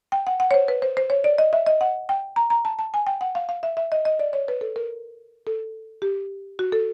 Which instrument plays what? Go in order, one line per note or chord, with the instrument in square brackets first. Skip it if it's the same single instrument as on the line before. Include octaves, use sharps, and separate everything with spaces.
[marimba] G5
F#5
F#5
C#5
C5
B4
C5
C5
C#5
D5
D#5
E5
D#5
F#5
G5
A#5
A#5
A5
A5
G#5
G5
F#5
F5
F5
E5
E5
D#5
D#5
D5
C#5
B4
A4
A#4
A4
G4
F#4
A4